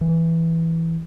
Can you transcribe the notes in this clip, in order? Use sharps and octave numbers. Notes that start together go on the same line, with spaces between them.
E3